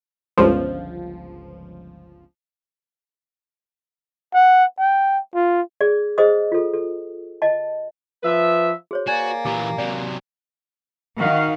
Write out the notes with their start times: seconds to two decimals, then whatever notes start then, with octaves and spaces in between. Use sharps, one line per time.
0.38 G1 C#2 F3
4.35 F#5
4.79 G5
5.35 F4
5.81 G#4 D5
6.18 G#4 C5 D#5 D#6
6.52 F4 A4
6.73 A4
7.42 D#5 A5
8.23 F3 B4 E5
8.91 F#4 G#4 C5 C#5
9.08 A#3 F#4 D5 G#5 G#6 A6
9.45 A#2 E3 G4 A#5 D6
9.78 C3 F#3 D5
11.20 D#3 F#4 F5